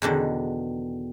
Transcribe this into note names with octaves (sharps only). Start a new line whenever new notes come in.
E2 B2 D3 D#3